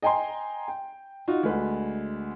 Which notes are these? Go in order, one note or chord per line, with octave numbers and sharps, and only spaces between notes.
D#5 G5 G#5 A#5 C6
G5
D#4 F4 F#4
D2 G#3 B4